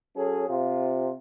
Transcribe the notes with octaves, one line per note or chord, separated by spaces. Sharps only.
F#3 C#4 G#4 A4
C3 F4